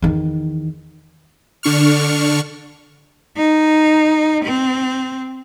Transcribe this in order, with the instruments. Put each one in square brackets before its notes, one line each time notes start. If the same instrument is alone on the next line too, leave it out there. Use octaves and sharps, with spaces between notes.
[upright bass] E2 D#3
[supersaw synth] D3 D4 C#6 F6
[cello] D#4
C4